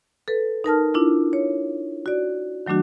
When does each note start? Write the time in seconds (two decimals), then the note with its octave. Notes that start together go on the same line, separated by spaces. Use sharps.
0.28 A4 B4
0.64 D#4 A#4 A5 F6
0.94 D4 E4 F4
1.33 C#5
2.06 F#4 D5
2.66 D#3 F#3 A3 D4 F#4